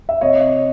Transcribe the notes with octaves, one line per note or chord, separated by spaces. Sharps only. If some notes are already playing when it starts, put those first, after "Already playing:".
E5
C3 C#5 D#5